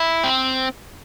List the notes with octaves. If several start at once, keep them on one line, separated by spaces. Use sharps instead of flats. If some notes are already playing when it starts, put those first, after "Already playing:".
Already playing: E4
C4